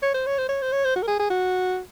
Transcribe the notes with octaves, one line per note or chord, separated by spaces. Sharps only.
C#5
C5
C#5
C5
C#5
C5
C#5
C5
F#4
A#4
G#4
G#4
F#4